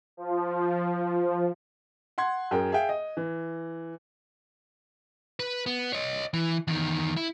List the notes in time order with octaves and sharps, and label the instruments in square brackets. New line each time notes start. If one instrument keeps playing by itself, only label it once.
[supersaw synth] F3
[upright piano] F#5 C6 G#6
F#2 G#4 A#4 G5
G#4 E5 F5 G5
D#5
E3
[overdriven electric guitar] B4
B3
C#5 D#5
E3
E2 D#3
E4